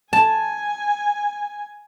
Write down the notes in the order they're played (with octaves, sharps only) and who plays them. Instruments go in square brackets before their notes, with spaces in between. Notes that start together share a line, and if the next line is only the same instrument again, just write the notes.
[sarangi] G#5 [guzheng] A5